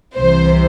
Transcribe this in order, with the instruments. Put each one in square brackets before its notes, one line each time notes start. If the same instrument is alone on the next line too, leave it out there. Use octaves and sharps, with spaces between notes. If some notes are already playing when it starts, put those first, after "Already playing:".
[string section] C2 C3 E3 C5